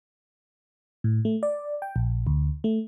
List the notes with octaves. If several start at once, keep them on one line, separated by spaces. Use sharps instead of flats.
A2
A3
D5
G5
A#1
D2
A3